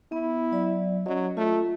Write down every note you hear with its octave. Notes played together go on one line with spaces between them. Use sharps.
B3 E4
F#3 D5
F#3 C#4 D#5
A3 F4